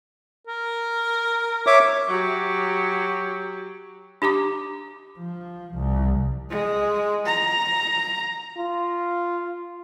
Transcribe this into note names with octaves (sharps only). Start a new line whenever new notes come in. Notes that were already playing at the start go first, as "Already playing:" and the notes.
A#4
C#5 E5 D6
F#3 G4
D4 G4 A#5 D6
F3
C2
G#3
A#5
F4